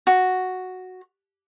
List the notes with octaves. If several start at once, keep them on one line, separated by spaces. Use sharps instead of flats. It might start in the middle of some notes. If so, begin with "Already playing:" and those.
F#4